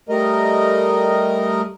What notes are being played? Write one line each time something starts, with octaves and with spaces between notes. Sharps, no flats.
G3 A3 A#4 D#5